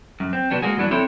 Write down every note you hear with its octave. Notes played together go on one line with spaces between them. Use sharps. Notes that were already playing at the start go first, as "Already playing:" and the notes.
F#2
C4
C3 F#3 B3 D4
G#3 A#3 F#4 G#4
E2 G2 E3 F#3 D4
C4 D4 E4 A4 C#5